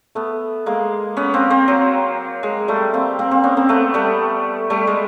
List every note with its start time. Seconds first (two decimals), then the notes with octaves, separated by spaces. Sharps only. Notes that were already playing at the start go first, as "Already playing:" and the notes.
0.15 A3 B3
0.66 G#3 A#3
1.16 B3 C#4
1.34 A#3 C4
1.50 A#3 C4
1.68 F#3
2.43 G#3
2.68 G3 A3
2.94 A#3 C4
3.19 A#3 C4
3.31 A#3 C4
3.44 B3 C#4
3.57 A#3 C4
3.69 A3 B3
3.94 G3 A3
4.70 G3 A3
4.87 G#3